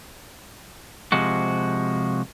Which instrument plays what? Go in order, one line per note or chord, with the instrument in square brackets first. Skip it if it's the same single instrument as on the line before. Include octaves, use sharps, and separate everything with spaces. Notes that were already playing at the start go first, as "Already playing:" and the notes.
[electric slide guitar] C3 F3 G#3 F#4